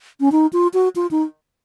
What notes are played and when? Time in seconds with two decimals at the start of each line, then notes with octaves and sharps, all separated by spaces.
0.20 C#4
0.32 D#4
0.53 F4
0.74 F#4
0.96 F4
1.11 D#4